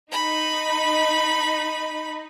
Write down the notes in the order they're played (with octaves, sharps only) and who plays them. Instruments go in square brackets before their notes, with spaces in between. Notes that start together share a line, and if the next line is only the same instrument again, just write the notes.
[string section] D#4 [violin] B5